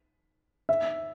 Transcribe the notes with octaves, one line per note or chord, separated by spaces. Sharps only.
E5